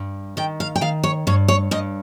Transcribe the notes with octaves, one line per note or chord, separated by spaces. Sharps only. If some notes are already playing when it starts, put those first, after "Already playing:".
Already playing: G2
D#3 G5
F5
G5
D#3 F5
C#5
G2 C#5
C#5
G2 D#5